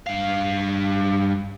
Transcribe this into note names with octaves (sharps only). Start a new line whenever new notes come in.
G2 F5